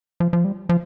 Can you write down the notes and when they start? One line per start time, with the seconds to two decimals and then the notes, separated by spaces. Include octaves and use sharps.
0.20 F3
0.33 F3
0.45 G3
0.69 F3